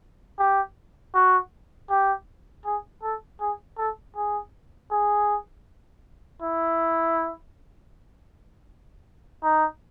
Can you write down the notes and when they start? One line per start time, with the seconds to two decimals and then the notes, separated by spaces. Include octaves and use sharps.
0.38 G4
1.14 F#4
1.90 G4
2.65 G#4
3.03 A4
3.40 G#4
3.78 A4
4.16 G#4
4.91 G#4
6.42 E4
9.43 D#4